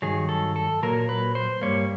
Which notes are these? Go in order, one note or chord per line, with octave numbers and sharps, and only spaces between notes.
G2 D#3 F#3 G#4
A4
A4
A#2 F#3 A#3 A#4
B4
C5
G2 E3 G3 A#3 C#5